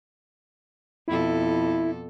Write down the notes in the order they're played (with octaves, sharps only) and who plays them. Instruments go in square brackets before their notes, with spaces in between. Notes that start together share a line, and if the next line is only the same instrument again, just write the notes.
[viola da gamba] F2 B2 A4 [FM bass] E4